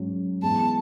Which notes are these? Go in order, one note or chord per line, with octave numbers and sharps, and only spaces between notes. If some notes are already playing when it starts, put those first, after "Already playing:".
Already playing: G#2 F#3 C#4
G#2 E3 G#3 B3 A5